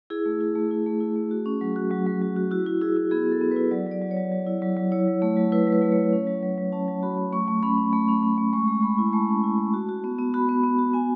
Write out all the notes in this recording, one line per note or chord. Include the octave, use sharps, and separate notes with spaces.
E4 G#4
A3
E4
A3
E4
A3
E4
A3
F#4
C#4
F#3
F#4
F#3
F#3
F#3
F#4
E4 F#4
E4
E4 G#4
E4
B3 G#4
B3
A4
B3
E4 B4
F#3 D5
F#3
D5
F#3
C#5
F#3
F#3
E4
F#3
F#3
E4 C#5
F#3
A3
F#3
E4 B4
F#3
B4
A3
A3 C#5
C#4
F#3
F#3
F#3
C#4 A5
F#3
F#4 B5
F#3
A3 C#6
A3
C#4 B5
C#4
A3
C#4
C#4
A3
G#3 C#6
G#3
G#3 B5
E4
G#3 A5
C#4
E4
G#3
F#4
F#4
B3
B3
F#4 B5
B3
B3
F#4
B3 G#5